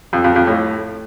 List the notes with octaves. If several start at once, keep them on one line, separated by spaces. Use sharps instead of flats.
F2
F2
F2
A2